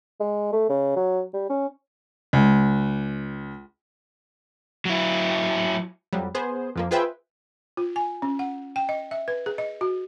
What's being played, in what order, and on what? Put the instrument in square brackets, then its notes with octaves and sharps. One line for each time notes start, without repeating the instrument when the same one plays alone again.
[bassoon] G#3
A3
C#3
F#3
G3
C#4
[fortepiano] C#2
[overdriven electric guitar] F#3 E4
[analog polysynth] F2 F#3 G3
B3 G#4 C5
F2 F3 A#3
F4 G#4 B4 C5 E5 G5
[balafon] F4
G#5
C#4
F#5
G5
D#5
E5
B4
G#4
D#5
F#4